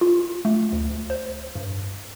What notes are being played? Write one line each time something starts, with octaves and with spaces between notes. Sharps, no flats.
F4
A3
D2
C5
G2